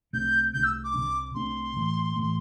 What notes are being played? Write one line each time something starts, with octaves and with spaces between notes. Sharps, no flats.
C2 C3 A3 D4 G6
C2 C3 A3 D4 G6
E6
D6
C2 C3 A3 D4
C2 C3 A3 D4 C6
A2 E3 A3
A2 E3 A3